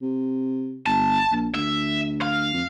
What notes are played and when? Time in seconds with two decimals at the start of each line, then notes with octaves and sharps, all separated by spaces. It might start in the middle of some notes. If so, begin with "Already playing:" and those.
0.02 C3
0.86 G1 A5
1.31 A#1
1.55 D2 E5
2.22 F5
2.54 F2